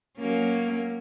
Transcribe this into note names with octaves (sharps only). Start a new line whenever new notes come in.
F#3 A#3 C#4